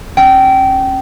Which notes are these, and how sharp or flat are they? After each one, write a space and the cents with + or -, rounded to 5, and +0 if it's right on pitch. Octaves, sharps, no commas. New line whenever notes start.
C#4 -30 G5 -25